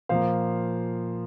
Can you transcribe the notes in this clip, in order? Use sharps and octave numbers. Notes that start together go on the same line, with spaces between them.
A#2 F3 A#3 C5 F5